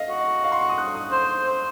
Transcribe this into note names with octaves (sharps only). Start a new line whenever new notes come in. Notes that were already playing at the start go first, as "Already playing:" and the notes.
Already playing: D#5 F5
F#4
F5
C6
C#6
D#6
F#6
D#6
C5
C5